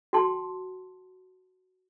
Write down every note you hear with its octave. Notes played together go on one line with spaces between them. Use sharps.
F#4 G5 A5 C6